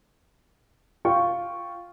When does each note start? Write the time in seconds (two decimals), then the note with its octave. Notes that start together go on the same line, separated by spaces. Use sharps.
1.05 F4 G5 C#6